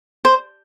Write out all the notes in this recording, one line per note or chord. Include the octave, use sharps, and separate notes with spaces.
C5